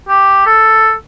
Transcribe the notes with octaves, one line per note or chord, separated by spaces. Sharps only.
G4
A4